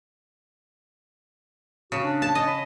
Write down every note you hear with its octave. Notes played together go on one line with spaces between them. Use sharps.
C#3 F#4
D4
A5
C#5 D#5
B5